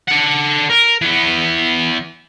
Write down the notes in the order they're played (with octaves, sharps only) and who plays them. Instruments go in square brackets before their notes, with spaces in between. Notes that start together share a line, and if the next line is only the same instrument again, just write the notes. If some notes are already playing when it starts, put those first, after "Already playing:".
[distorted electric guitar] A4 F#5
A#4
E3 B3